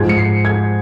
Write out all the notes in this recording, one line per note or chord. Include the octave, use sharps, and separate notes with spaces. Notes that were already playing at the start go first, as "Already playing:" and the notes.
Already playing: G#2 F3 G#3 G#6
C#7
C7
G#6